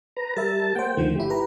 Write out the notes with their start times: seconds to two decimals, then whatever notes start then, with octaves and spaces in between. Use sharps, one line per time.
0.16 B4 A#5
0.36 G3 A#4 E5 A5
0.75 A#3 C5 F#5 G5
0.97 D2 D3 D#3 F3 A3
1.16 G1 E4 G4
1.30 B4 A#5